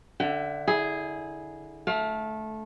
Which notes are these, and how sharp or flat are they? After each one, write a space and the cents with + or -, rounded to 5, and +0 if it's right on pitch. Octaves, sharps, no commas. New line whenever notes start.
D3 +0 E5 +20 G5 -45
E4 -25 G#4 +0
A3 -15 F5 +25